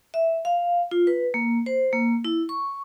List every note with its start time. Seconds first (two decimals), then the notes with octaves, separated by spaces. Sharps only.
0.14 E5
0.45 F5
0.91 F4
1.07 B4
1.34 A#3
1.66 C5
1.93 A#3
2.25 E4
2.49 C#6